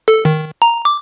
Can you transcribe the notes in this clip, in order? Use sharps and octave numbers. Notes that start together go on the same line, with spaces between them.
A4
D#3
A#5
D6